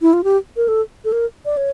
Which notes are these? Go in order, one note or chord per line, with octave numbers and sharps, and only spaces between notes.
E4
F4
G4
A#4
A4
A4
A#4
D5
C#5